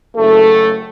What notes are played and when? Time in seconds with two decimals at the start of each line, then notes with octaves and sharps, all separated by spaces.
0.16 F#1 A3 A4